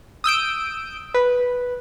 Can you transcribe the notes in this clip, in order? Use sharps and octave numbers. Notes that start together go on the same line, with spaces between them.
D#6 E6 G6 D7
B4